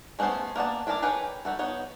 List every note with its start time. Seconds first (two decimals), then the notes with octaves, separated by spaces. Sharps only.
0.19 G#3 A3 B3 C#4 C5
0.56 A#3 B3 D4 A5
0.87 D4 E4 A#4 A5
1.02 G#4 A#4 B4 C#5 G5
1.45 D#4 E4 F#4 A4
1.59 B3 D#4 C#5